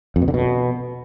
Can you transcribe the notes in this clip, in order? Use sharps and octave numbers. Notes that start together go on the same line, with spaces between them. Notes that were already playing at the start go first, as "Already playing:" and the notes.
F2
B2
D3
B2